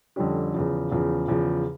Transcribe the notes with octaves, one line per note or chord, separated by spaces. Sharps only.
F2 D3 G3 C#4 G4
E2 C#3 F3
E2 C#3 F3
E2 C#3 F3